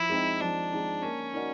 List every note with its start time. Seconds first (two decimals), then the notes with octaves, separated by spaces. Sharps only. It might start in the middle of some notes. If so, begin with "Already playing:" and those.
Already playing: F3 E4
0.09 G#3 C4 D#4
0.40 F3 D4
0.72 G#3 C4 D#4
1.03 A#3 C#4
1.33 D#4 F#4 A#4 D5